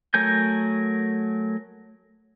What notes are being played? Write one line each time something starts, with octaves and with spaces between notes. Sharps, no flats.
F#3 A3 A#4 G#5 G6